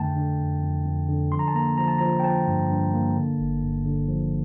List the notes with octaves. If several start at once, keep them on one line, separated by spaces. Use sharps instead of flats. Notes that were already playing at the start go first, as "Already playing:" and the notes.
Already playing: F2 D3 A3 G5 A5
D3
F2
F2
F2
D3
F3 C6
A#5
A5
A#3 A#5
F3 A#5
A5
F3 A#5
G5
F3 A5
G2
G2
A#3
D3
G1
G2
D3
F3